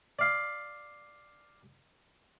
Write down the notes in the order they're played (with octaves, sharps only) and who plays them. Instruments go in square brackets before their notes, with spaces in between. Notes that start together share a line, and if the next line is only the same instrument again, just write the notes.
[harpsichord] D5 F5